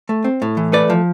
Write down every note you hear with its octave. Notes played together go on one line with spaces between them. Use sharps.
A3
C4
A2
E3
A3 B4 D5
F3